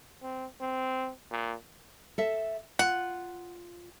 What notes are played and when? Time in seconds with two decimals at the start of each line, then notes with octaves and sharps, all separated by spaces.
0.22 C4
0.61 C4
1.31 A#2
2.18 A4 E5
2.79 F4 F#5